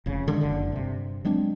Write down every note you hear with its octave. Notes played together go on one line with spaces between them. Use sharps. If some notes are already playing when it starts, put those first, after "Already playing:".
F1 C#3
D3 D#3 G#3
F#1 D3
G2 C3
F#3 G#3 C4 D4